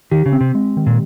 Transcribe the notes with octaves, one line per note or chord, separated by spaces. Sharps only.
D#3 G4
C#3
C4
C3
G#3
D#3
A#2